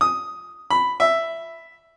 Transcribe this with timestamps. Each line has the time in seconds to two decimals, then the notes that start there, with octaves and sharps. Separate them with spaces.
0.01 D#6
0.71 B5
1.00 E5